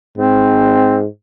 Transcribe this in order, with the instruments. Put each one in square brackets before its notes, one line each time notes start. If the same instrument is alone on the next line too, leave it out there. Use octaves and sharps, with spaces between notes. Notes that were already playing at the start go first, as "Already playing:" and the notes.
[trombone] G#2 [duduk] C4